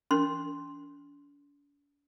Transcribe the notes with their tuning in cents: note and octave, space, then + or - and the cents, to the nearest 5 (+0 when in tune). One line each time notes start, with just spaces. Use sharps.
D4 -45 C6 +0